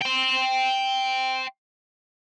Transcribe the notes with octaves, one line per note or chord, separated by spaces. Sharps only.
G5 C6